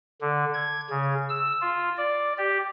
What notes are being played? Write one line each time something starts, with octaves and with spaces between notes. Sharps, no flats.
D3
G#6
C#3
E6
F4
D5
G4